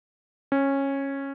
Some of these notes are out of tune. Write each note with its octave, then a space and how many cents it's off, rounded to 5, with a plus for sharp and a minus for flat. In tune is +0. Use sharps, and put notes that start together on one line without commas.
C#4 -15